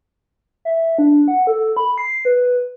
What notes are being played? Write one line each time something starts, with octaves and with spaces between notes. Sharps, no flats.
E5
D4
F#5
A4
B5
C7
B4